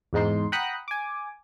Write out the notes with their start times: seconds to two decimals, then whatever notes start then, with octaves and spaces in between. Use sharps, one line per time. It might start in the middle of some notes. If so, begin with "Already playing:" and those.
0.13 E2 G#2 D#4 C6
0.52 F#5 G5 A#5 B5 D#6 F#6
0.88 G#5 D6